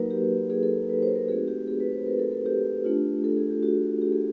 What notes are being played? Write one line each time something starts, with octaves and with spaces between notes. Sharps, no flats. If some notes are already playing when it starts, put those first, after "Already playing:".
Already playing: F#3 A#3 D#4 F#4 A#4 B4
G4
G#4
A4
B4
C5
A#4
A3 C4 D#4 F#4 G#4
G4
G#4
B4
C5
A#4
A4
A4
G4
A3 D4 F4
A4
G#4
G4
F#4
G4
G#4